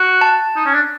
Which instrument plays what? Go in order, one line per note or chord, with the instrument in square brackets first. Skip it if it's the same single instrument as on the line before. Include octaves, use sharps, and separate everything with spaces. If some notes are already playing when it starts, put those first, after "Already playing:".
Already playing: [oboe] F#4
[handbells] A5
[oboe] D#4
C#4
D4